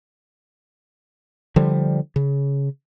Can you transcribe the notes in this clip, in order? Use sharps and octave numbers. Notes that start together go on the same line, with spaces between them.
D3 F3 G3
C#3